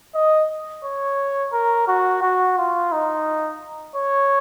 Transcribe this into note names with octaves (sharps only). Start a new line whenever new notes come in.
D#5
C#5
A#4
F#4
F#4
F4
D#4
C#5